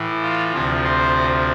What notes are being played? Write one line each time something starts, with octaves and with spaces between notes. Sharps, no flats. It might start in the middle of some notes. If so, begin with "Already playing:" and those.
Already playing: A2 E3
F4
D2 C3 F3 F4
C5